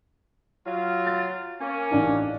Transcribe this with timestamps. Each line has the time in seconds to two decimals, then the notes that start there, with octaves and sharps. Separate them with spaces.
0.65 F#3 F4
1.07 A6
1.60 A#3 C#4
1.91 A1 D4 D#4